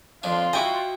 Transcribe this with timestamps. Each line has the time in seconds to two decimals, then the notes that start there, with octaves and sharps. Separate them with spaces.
0.23 F2 D4 F4 C6
0.53 E4 F#4 D#5 G5